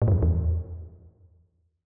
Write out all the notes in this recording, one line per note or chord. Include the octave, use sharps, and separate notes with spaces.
A2
G2
F2
E2